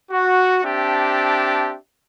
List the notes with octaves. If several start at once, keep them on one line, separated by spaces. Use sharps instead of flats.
F#4
C4 D4 G4 E5 A5